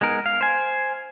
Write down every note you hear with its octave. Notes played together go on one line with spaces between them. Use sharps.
G#3 B3 D#4 A#4
F5
C5 G#5